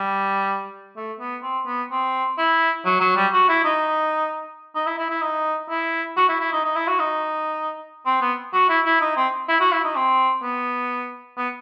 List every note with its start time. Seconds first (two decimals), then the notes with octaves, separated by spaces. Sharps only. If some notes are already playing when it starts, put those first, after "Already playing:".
Already playing: G3
0.96 A3
1.20 B3
1.43 C4
1.66 B3
1.91 C4
2.38 E4
2.86 F#3
3.01 F#3
3.16 G3
3.33 F#4
3.49 E4
3.64 D#4
4.75 D#4
4.87 E4
4.98 E4
5.10 E4
5.22 D#4
5.70 E4
6.17 F#4
6.29 E4
6.40 E4
6.53 D#4
6.64 D#4
6.76 E4
6.88 F#4
6.99 D#4
8.06 C4
8.22 B3
8.54 F#4
8.70 E4
8.86 E4
9.01 D#4
9.17 C4
9.49 E4
9.61 F#4
9.72 E4
9.85 D#4
9.96 C4
10.43 B3
11.38 B3